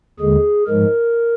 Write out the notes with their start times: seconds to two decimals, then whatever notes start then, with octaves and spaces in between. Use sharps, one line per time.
0.19 D#2 D3 G#3 G#4
0.67 G#2 F3 G#3 A#4